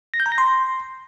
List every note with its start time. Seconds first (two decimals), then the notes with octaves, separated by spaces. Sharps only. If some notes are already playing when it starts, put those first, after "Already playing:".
0.14 A#6
0.20 G6
0.26 A#5
0.32 A#6
0.38 C6